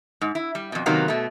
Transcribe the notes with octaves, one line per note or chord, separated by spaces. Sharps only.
G#2
E4
G3
F2 B2
C3 D#3 F#3 A#3 B3
B2 A3